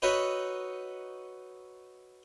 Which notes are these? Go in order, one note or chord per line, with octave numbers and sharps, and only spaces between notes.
D#4 F#4 B4 C#5 E5